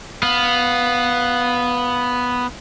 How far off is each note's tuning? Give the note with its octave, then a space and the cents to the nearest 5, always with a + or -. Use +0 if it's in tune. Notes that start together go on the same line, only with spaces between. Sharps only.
B3 +0 F5 +15